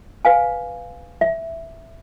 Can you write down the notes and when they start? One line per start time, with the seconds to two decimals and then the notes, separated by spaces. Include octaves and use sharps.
0.25 B4 F5 G#5
1.21 E5